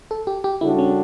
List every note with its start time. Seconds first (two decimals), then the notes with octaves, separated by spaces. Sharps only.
0.11 A4
0.27 G4
0.44 G4
0.61 C#3 G3 D4 E4 F#4 A4
0.79 C#4